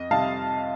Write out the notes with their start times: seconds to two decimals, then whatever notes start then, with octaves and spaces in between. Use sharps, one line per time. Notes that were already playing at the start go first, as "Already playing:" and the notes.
Already playing: F2 D#5
0.11 C3 G3 F5 A5